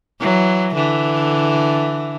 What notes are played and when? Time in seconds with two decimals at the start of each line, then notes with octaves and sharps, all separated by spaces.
0.20 E3 F#3
0.75 D3 E3